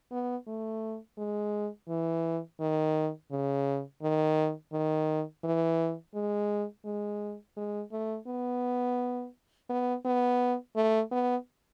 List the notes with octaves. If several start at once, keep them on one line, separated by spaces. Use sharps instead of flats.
B3
A3
G#3
E3
D#3
C#3
D#3
D#3
E3
G#3
G#3
G#3
A3
B3
B3
B3
A3
B3